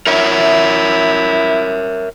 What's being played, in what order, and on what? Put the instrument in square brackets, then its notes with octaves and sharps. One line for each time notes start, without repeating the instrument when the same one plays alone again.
[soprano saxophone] E4 [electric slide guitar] A#4 C#5 E5